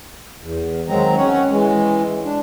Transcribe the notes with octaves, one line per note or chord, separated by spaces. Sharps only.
E2
D#3 F#3 G#3 C4 A#5
C#4 C#5 F#5
E3 G#3
D4